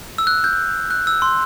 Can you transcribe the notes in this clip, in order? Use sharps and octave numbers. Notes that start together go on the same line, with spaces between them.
E6
F#6
G6
F#6
E6
C6